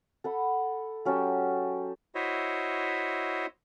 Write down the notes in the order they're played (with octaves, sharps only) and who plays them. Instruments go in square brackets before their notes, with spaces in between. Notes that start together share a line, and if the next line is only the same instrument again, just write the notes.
[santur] A4 F#5 B5
F#3 C#4 G4 A4
[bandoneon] E4 F#4 C5 C#5 D#5 E5